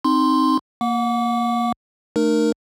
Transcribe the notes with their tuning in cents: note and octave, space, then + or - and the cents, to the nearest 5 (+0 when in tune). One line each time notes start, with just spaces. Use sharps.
C4 +0 D#4 +0 C6 +0
A#3 +0 F#5 -35 D6 -35
A3 +0 D#4 -45 A#4 +0